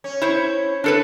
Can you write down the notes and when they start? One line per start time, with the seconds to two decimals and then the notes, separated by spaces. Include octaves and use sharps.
0.04 C#4
0.22 E4 C5 C#5
0.84 D4 A4 B4